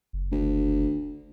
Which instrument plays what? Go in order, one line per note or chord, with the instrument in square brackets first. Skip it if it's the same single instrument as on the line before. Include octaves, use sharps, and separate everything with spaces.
[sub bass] F#1
[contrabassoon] D2